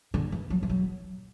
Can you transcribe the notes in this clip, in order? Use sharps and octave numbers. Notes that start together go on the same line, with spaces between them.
D3
E3
F#3
E3
F#3